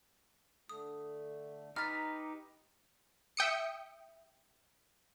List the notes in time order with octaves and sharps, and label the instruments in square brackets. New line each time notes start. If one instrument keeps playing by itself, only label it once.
[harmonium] D3 A3 [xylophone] D#6
[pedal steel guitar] D#4 G4 B4 [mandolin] A#5 B5 [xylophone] F6 A6
[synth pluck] E5 G5 D#6 C#7